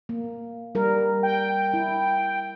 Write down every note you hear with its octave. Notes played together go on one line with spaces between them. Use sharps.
A#3
G3 A#4
G5
E4